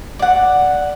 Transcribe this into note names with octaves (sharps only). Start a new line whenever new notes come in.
D5 F#5